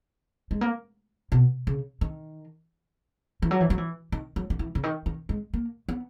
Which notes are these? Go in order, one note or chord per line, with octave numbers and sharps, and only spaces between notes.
G#3
A#3
B2
C#3
D#3
E3
F#3
E3
F#3
E3
D#3
F#3
D#3
E3
C#3
D#3
D#3
G#3
A#3
B3